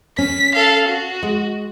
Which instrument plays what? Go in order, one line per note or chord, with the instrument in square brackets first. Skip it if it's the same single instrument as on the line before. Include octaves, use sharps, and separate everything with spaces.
[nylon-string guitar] C#4 [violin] B6
[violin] A4 F5
F#4
[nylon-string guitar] G#3